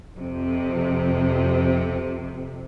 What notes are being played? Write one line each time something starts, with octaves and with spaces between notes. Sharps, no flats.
F2 C3